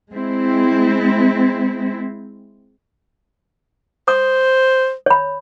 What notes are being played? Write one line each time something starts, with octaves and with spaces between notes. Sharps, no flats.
G#3 C4 E4
C5 D#6
C#5 B5